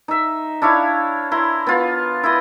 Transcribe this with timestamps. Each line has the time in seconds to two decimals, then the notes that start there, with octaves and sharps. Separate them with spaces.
0.08 D#4 E5
0.62 D4 E4 C#5 F5
1.32 E4 A#5 C6
1.67 B3 F4
2.24 E4 B4 D#5